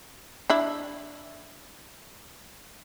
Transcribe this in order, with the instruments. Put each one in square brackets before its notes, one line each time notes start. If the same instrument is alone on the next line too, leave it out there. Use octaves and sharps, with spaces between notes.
[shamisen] D4 E4